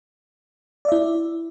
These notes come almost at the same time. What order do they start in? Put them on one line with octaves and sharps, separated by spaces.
D5 E5 E4